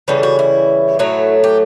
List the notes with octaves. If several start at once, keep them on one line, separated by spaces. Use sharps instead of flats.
C#3 E3 G3 A4
F#4
E4
A2 F#3 A3
G4